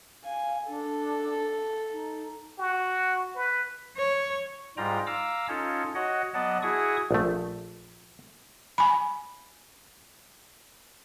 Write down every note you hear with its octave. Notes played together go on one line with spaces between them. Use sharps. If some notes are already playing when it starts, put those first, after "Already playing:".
F5 G#5
D4 A4
D#4
F#4
B4
C#5
G#2 G3 F4 G5 A#5
F5 A#5 D6 E6
C#4 D#4 F4 A4 C#5
F#4 C#5 D#5 F#5
F#3 B3 D5 D#5 F#5 A5
E4 F#4 G#4 C#6 D#6
A#1 A3
G#5 B5